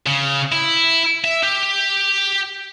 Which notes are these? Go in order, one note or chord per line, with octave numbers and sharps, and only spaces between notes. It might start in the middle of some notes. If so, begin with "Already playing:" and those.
C#3
E4
E5
G4